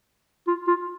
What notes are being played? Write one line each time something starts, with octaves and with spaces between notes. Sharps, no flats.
F4
F4